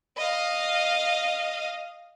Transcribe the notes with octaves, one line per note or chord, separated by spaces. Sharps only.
D#5 F5